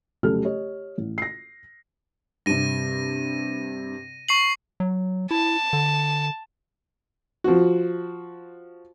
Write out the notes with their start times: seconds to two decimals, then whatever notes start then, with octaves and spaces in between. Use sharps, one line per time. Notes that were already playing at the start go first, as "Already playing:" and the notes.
0.23 F1 C#3 F#3 G4 A4 F6
0.44 G4 C#5 D#5
0.98 A1
1.18 A#6 C7
2.46 G2 C3 A#6 D#7
4.29 C#6 C7 F#7
4.80 F#3
5.31 E4 A5
5.73 D3
7.44 F3 F#4